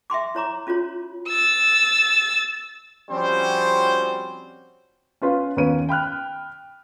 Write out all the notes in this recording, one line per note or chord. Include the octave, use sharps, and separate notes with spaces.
E5 G5 C6 D6
E4 C#5 A#5 D6
C#4 F4 F#4 C#5
E6 A6
F3 G3 C4 C#4 F#4 C5
C#4 F4 B4
D#2 B3 C#4 B4 D#7
G5 B5 F6 F#6